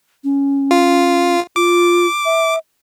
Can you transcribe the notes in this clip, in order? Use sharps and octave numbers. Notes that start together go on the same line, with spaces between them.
C#4
F4
F4 D6
E5